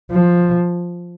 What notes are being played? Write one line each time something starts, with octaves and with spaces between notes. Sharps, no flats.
F3